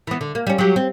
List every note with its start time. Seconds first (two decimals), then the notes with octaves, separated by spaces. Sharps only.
0.07 E3 B3
0.21 D3
0.35 A#3
0.47 G3 C#4
0.58 F#3 G4
0.76 C4